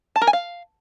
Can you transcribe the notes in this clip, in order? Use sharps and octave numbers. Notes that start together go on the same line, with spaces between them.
A5
A#4
G#5
F5